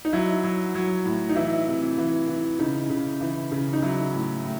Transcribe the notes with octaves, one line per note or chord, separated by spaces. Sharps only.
D#4
F#3 E4
F#3
F#3
A2
D#4
E3 E4
C3
E3
E3
C#3 D#4
C#3
E3
C#3
D#4
F#3 E4
A2
A2